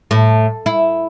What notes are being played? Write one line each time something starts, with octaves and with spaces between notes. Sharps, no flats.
A2
E4